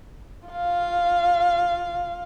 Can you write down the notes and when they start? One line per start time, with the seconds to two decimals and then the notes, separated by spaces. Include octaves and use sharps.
0.48 F4 F5